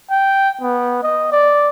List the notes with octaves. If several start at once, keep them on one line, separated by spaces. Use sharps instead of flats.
G5
B3
D#5
D5